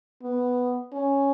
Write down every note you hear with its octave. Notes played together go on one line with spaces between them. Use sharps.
B3
C#4